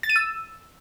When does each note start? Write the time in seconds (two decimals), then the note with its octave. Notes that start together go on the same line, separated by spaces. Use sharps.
0.03 A6
0.10 D#7
0.16 E6